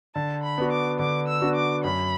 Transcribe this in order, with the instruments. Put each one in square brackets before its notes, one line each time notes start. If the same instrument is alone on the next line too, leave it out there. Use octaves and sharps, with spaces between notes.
[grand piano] D3 [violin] A5
[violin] B5
[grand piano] B3 D4 F#4
[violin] D6
[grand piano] D3 [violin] D6
[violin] E6
[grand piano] B3 D4 F#4
[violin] D6
[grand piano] F#2 [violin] B5